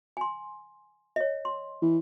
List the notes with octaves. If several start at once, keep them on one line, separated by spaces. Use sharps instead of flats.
G#5 C6
C#5 D#5
C6
E3